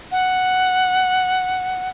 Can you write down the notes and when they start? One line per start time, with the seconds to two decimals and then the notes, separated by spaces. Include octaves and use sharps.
0.12 F#5